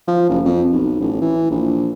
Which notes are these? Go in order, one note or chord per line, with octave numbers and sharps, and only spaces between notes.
F3
F#1
F2
B1
A1
E3
A#1